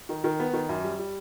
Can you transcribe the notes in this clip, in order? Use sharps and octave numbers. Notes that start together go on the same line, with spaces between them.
D#3
D#3
B3
D#3
F#2
G3
G3